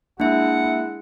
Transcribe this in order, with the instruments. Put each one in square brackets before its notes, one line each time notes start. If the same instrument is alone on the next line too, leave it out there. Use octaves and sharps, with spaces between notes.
[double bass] G#3 E4 [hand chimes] A#3 E5 [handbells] D4 [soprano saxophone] F#5